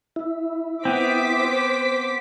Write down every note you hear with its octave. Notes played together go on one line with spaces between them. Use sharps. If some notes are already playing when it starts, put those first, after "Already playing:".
E4
B3 C4 C5 D6 B6